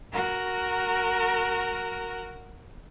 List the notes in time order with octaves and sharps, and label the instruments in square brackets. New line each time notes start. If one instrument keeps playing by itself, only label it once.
[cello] F#4 A#4